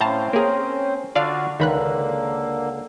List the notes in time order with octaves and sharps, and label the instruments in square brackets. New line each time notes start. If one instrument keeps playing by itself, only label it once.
[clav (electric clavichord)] A2 F5 [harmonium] C4 C#4 C5 [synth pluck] A5 A#5 G6
[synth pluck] A#3 G#4 [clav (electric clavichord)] A#4 A#5
[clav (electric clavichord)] D3 D4 F4 [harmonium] F#4 [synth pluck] D5 F5
[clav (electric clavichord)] C#2 [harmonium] D3 A#3 [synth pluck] D#3 B5 F#6